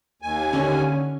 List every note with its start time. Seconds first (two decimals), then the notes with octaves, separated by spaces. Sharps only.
0.22 D#2 G#5
0.53 D3 C#4